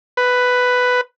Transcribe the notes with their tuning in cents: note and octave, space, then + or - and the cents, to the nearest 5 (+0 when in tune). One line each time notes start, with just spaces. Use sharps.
B4 +5